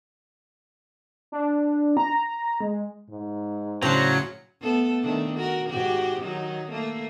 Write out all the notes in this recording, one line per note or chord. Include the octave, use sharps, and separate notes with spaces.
D4
A#5
G#3
G#2
A2 C#3 F#3 D4 C5 C#7
A3 B3 A4
D#3 A3 D4
F#4 A#4
G#2 F#4 G4
D#3 F#3 D#4
A3 A#3